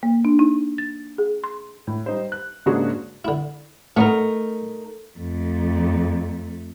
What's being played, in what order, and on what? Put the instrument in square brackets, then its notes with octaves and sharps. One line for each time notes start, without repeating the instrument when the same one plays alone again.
[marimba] A#3
D4
D#4
A6
G#4
C6
[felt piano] A2
G3 D#4 C5
F#6
G#2 C#3 A#3 D4 F#4 G#4
[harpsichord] D3 E4
[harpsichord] A2 B3 C#5 [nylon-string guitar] A3 D#4 A#4
[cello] F2 A3